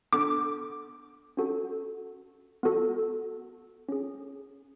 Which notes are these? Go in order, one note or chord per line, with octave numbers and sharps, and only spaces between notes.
B3 D4 A4 D6
C#4 F#4 A4
B3 F#4 A4
C#4 G#4